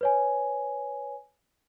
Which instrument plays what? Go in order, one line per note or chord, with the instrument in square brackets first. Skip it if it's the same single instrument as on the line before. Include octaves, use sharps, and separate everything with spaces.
[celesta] B4 C#5 G#5